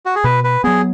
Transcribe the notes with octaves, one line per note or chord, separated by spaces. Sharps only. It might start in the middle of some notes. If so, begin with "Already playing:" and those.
F#4
G#4
B2 B4
B4
F#3 B3 G#4